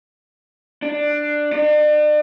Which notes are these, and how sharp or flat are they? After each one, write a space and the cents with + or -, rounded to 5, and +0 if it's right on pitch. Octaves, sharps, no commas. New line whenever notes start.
D4 +10
D4 +40